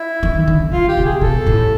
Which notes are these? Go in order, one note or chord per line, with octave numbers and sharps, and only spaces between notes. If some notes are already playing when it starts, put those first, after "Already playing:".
Already playing: E4
D#3
D3
D3 F4
G4
C3
G#4
B2 A4
A2